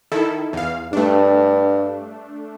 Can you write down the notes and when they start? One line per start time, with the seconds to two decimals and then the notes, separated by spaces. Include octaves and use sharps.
0.12 D#3 E4 A4
0.53 E2 F5
0.93 G2 A3 D4